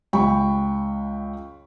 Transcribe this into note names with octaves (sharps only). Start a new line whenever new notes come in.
C#2 G5 B5 C#6